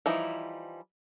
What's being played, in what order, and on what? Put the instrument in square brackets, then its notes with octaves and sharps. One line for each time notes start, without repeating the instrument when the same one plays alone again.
[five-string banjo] E3 F3 G3 D#4 E4